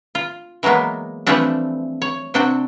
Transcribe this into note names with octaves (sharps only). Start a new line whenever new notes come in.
F4
E3 F#3 G#3 A#3 B3
E3 F3 G3 A3 C4 D4
C#5
C3 C4 D4 F#4 G5